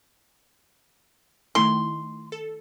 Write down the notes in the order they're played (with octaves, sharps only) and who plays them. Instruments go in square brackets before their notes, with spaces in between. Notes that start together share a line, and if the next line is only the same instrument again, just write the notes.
[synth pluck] D#3 A3 E4 [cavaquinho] C6
[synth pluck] A4